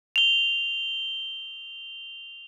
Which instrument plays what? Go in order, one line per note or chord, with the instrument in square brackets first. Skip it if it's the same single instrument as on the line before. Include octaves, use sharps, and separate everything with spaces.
[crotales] F7 G7